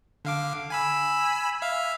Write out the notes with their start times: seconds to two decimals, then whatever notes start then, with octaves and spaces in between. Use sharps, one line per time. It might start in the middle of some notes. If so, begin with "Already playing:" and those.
0.25 D3 F5 D6
0.70 G#5 B5 E6
1.62 E5 F5 F6